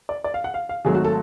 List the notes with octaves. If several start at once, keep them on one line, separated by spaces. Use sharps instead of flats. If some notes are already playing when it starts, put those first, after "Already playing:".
D5
D5
F5
F#5
F5
F5
G#1 G#2 F#3 A3 G#4
F#4
A4